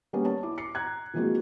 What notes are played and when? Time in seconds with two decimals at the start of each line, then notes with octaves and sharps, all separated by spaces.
0.13 G3 A#3 B3 C#4 G4
0.25 C#5 A5
0.43 E4 D6
0.58 D6 C7 C#7
0.75 A#5 F#6 G#6
1.14 E3 F3 G#3 A#3 C4 F#4